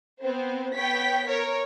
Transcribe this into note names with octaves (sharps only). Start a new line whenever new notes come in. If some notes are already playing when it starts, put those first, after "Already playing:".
B3 C4 C5
B3 C#5 G5 B6
A#4 C#5